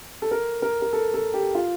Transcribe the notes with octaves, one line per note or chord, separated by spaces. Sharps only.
A4
A#4
A#4
A#4
A4
A4
G4
F4